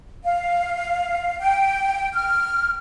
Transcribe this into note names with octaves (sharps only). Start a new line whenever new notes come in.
F5
G5
F6